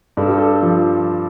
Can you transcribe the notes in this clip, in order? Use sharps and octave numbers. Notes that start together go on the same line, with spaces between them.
G2 A4
G4
A4
F3